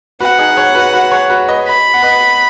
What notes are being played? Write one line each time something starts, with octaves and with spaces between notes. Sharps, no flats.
F#4 B4 F#5
D#4 G#4
G#4 C#5
F#4 B4
F#4 B4
G#4 C#5
F#4 B4
B4 D#5
B5
F#5
B4 D#5